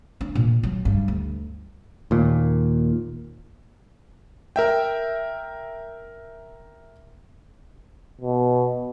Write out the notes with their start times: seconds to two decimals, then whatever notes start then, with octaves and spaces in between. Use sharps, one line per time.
0.21 D4
0.35 A#2
0.63 F#3
0.85 G2
1.08 D2
2.11 D#2 A#2
4.56 A#4 E5 G5
8.22 B2